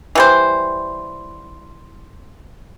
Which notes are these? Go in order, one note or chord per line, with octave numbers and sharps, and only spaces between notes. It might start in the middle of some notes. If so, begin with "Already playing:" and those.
E3 G3 C5